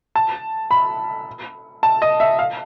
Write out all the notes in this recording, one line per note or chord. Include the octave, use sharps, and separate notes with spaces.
A5
B5
A5
D#5
E5
F5